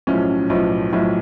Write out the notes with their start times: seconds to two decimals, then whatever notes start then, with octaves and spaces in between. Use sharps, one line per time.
0.07 B1 A2 F3 C#4
0.50 B1 A2 F3
0.92 B1 A2 F3